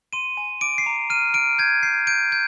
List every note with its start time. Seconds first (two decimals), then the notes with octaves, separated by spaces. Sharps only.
0.13 C6 D#7
0.37 G#5
0.61 D6 D7
0.78 C7
0.86 A#5
1.10 F6 D#7
1.34 F6 D7
1.59 G6 G#6
1.83 G6 C7
2.07 G6 D7
2.32 G6